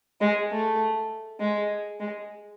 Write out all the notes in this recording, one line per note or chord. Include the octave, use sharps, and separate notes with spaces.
G#3
A3
G#3
G#3